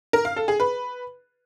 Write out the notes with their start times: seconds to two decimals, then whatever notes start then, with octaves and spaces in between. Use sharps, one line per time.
0.13 A#4
0.25 F5
0.36 A4
0.48 G#4
0.60 B4